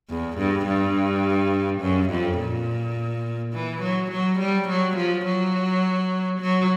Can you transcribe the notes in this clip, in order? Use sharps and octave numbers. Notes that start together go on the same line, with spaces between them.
E2
G2
G2
F#2
F2
A#2
E3
F#3
F#3
G3
F#3
F3
F#3
F#3